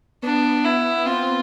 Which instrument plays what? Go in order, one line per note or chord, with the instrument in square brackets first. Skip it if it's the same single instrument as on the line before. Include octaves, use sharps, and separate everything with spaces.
[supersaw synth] B3 [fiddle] D4
[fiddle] E4
[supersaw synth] C4 [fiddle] F4